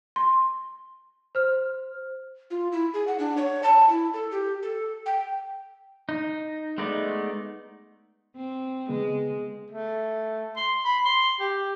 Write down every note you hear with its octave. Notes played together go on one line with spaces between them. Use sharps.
C6
C5 F6
F4
E4
G#4
F#5
D4
C#5
A5
E4
A4
G4
A4
G5
D#4
G#3 A3 B3 D#4 D5
C4
C#3 G#3 B3
A3
C6
B5
C6
G4